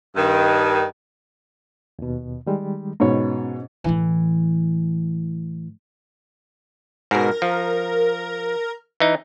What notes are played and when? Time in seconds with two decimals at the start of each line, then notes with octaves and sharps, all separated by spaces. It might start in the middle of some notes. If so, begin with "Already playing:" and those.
0.16 G2 D#3
1.99 D#2 B2
2.47 D#3 G3 G#3
3.00 G#2 B2 C#4 C#5
3.84 A2 E3
7.11 G#2 B2 A#4
7.42 F3
9.00 E3 D#4